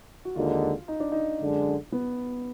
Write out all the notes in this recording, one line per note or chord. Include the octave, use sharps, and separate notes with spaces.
F#4
D#2 D3 G#3 D#4 F4
D#4
D4
D#4
F#2 D3 G#3 D4
B3